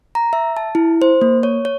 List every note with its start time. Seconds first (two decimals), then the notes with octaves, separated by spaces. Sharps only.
0.15 A#5
0.33 E5
0.57 A5
0.75 E4
1.02 C5
1.21 A#3
1.43 C#5
1.65 C#5